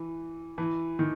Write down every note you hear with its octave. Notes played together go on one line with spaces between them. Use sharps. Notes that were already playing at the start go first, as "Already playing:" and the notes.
Already playing: E3
E3
D#3